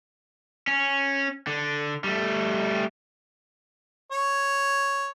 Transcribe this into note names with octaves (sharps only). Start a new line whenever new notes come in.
C#4
D3
G3 A3
C#5